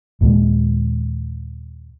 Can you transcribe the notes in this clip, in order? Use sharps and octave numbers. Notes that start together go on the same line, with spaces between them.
D#2 A#2 G#3